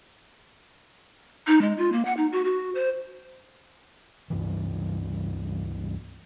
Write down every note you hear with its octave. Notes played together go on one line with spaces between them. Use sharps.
D#4
G#3
F4
A#3
F#5
D#4
F#4
F#4
C5
C#2 G2 E3